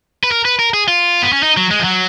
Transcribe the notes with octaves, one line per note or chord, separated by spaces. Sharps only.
B4
A#4
B4
A#4
G#4
F4
B3
C#4
D#4
F#3
G#3
F3
F#3